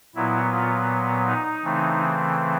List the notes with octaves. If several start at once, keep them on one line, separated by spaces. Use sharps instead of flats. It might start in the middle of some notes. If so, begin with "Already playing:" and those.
A#2 F#3 B3 E4
F4
D#4
C#3 E3 A3 C4